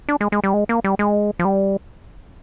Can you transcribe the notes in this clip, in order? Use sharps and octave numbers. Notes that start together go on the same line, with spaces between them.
D4
G#3
G#3
G3
G#3
A#3
G3
G#3
F3
G3